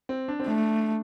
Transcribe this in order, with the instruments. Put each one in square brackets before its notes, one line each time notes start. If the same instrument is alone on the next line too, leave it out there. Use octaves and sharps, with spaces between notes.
[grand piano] C4
D4
C4
[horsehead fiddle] A3 [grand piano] D4